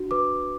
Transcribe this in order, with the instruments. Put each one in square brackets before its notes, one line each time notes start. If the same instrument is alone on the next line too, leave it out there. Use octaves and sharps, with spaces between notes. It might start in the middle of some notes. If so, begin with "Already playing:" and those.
Already playing: [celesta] D4 F#4
B4 D6